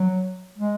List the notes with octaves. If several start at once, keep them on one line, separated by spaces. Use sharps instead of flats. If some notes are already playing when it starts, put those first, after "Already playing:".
Already playing: F#3
G#3